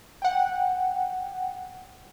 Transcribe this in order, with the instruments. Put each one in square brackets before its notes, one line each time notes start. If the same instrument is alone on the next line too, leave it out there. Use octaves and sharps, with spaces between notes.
[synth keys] F#5 G5